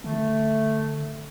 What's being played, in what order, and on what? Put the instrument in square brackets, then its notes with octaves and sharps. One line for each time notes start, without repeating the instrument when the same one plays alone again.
[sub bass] D3 [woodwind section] A3